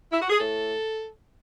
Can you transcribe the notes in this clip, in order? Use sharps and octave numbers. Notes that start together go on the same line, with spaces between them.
E4
F#4
G#4
A2 A4